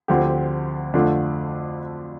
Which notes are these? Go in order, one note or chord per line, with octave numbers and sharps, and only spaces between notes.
D2 D3 F3 C4 G4
F2 D3 A3 D4 F4